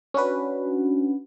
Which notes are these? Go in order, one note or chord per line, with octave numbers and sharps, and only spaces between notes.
C#4 D4 F#4 B4